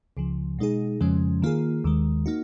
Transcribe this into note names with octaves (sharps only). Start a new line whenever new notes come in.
C#2 C#3 F3
B2 G#3 D#4 G#4
F2 C#3 F3 G#3 C#4
D#3 A#3 F4 G#4
D#2 D#3 G#3
A#3 D#4 F#4